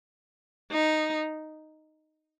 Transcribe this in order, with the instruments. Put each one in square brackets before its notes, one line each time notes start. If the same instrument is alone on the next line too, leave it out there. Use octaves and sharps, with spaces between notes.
[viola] D#4